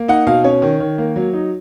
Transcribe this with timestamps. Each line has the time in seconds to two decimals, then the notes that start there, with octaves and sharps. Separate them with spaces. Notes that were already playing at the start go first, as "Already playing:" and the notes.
Already playing: A#3
0.08 D#4 F#5
0.26 B2 F5
0.44 C#4 C#5
0.62 D#3
0.80 D#3
0.98 A#3
1.16 F#3
1.33 D#4